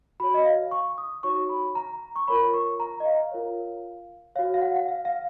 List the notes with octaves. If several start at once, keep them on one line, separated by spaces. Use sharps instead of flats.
F#4 C#5 B5
D#5
F5
C#6
D#6
D#4 F#4 C#5 C#6
B5
A#5
C#6
F4 A#4 C#5 B5
C#6
A#5
D#5
F5
F4 A#4 C#5
F#4 C#5 F5
F5
F#5
F#5
F5
F5